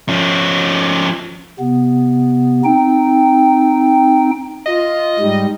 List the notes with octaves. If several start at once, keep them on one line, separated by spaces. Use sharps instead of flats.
F3 C#4
C3 B3
C4 D#4 G5
F4 D#5
G#2 G3 D#4